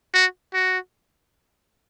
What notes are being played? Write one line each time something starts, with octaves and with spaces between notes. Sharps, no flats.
F#4
F#4